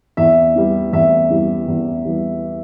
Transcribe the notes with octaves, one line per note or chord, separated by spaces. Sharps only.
E2 E5
E3 G3
E2 E5
E3 G3
E2
E3 G3